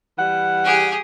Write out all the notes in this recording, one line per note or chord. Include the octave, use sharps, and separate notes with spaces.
E3 G3 F#5
G4 G#4